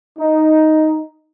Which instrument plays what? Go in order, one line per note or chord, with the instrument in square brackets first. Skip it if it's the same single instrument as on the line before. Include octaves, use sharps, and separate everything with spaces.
[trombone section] D#4